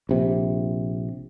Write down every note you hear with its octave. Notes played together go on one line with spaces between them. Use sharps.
A#1 C3